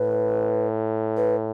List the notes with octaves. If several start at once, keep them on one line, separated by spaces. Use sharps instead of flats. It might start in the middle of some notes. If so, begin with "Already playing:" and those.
Already playing: A2 B4
B4